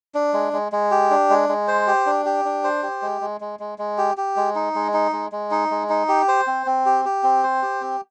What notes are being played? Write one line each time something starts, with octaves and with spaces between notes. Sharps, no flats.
D4
G#3
G#3
G#3
G4
D4
G#3
G#3
C5
G4
D4
G4
D4
C5
G4
G#3
G#3
G#3
G#3
G#3
G4
G4
G#3
D#4
G#3
D#4
G#3
G#3
D#4
G#3
D#4
G4
C5
C4
C4
G4
G4
C4
C5
G4
C4